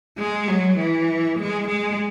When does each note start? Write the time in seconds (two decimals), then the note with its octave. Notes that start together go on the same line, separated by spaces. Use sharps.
0.18 G#3
0.48 F#3
0.77 E3
1.38 G#3
1.67 G#3